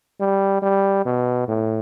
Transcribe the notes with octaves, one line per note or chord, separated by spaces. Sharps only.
G3
G3
B2
A2